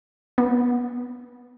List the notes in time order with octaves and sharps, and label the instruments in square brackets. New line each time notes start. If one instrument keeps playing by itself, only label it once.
[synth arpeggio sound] B3